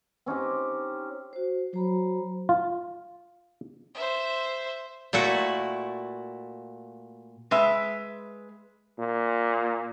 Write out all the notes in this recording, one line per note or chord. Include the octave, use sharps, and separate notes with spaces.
C4 C#4 D#4 G4
F#4 C5
F#3 C5 A#5 B5
F4
C5 E5
A#2 A3 E4 F#4
G#3 B4 E5
A#2